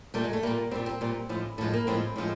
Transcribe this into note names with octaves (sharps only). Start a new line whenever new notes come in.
A#2 G3 A3
G#3
A3
A#2 G3 A#3
A#2 G3 C4
C4
A#2 G3
A2 F3 G#3
A2 F3 G#3 A3
A#3
A2 F3 G#3 C4
A2 F3 G#3